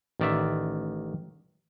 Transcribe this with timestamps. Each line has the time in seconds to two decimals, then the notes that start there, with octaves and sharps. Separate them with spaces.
0.20 A1 D#3 D5 E5